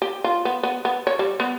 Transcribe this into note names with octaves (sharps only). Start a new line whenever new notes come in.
G4
F4
B3
B3
B3
C#5
G3
B3